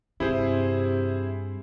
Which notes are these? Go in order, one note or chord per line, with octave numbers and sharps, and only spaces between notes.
G2 C3 E4 G#4 C5